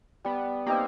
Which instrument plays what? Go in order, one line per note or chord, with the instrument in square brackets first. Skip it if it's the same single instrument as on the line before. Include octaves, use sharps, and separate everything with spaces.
[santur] G3 [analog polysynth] B3
[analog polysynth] A#3 [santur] C4 D#4 G4